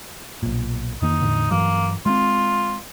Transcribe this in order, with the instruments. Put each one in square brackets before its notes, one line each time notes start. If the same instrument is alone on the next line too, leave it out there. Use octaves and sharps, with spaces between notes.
[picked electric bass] B1 A#2
[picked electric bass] F2 D#3 A#3 [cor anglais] D#4
[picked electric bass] E2 A2 D3
[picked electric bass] G2 E3 F#3 [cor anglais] A#3
[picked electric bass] G#3 A3 C4 [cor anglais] F4